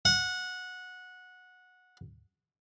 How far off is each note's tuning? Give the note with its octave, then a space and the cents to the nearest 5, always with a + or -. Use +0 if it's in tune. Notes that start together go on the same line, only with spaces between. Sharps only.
F#5 -15